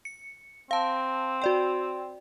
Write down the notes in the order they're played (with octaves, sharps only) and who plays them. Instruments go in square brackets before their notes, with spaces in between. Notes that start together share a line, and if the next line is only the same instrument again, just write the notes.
[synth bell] C#7
[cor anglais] C4 [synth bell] F5 A5
[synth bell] F#4 D5 G5